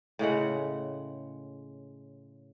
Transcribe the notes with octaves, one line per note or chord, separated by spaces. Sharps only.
A2 C#3 G#3 F#5